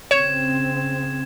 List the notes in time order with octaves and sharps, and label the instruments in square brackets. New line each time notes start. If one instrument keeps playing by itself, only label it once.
[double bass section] C#3 C4 [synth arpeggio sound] C#5 [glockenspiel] G#6 E7